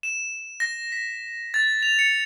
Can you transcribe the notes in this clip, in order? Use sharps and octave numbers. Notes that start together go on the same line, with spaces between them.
E7
A#6
B6
A6
F7
C#7